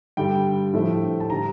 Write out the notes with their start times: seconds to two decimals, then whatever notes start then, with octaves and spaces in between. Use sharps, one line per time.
0.17 G2 D3 G3 G5
0.73 A2 F3 A3
1.20 A5
1.30 D3 G3 A#5